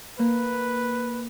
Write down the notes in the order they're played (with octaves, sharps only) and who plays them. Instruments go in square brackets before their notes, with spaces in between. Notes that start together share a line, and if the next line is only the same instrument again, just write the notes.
[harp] A#3 [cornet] B4